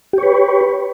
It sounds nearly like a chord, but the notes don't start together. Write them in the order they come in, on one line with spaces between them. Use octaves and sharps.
G4 C#5 B4